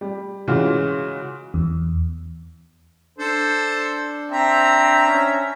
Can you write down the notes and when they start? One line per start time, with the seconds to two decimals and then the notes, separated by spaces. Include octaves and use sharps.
0.01 G3
0.47 C#3 E3 G#3 F4 F#4
1.54 E2
3.18 D4 A4 C5
4.32 C4 E5 A#5
5.07 C#4